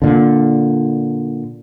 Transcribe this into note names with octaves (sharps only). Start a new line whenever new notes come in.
A#2 D3